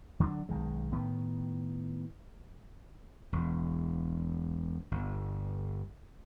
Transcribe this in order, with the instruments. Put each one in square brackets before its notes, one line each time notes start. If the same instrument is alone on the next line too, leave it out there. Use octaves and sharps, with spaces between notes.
[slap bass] D3 F#3 B3 D4
B1 D#3 G#3
A2 D#3 B3
E1
G1